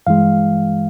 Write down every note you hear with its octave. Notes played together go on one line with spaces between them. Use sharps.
G2 E3 G#3 F5